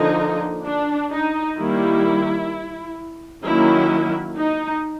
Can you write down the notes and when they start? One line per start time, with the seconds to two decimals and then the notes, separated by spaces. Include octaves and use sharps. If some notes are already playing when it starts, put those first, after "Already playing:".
Already playing: D3 F3 A#3 D#4
0.65 D4
1.12 D#4
1.58 D#3 G3 A#3 E4
3.44 D#3 F#3 A#3 C#4 E4
4.37 D#4